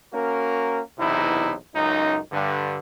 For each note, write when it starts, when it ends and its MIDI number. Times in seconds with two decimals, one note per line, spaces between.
0.13 0.80 58
0.13 0.80 61
0.13 0.80 66
0.13 0.80 70
0.99 1.54 35
0.99 1.54 40
0.99 1.54 48
0.99 1.54 63
0.99 1.54 64
1.76 2.18 37
1.76 2.18 42
1.76 2.18 63
2.32 2.78 43
2.32 2.78 50